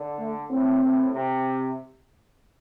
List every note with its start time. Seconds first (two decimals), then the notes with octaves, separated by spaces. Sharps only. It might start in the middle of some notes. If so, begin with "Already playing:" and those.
Already playing: D3
0.19 A3
0.50 A2 C4
0.82 A2
1.13 C3